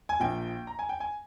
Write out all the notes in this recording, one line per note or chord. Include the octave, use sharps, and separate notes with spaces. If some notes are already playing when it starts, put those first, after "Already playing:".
G#5
A#1 A#2 F3 G5
A#5
G#5
G5
G#5